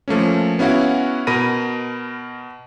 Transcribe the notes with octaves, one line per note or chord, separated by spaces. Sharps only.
F3 A3 A#3 C#4
B3 C#4 E4 F#4 F5 F#5
B2 A#4 B5 A#6 D#7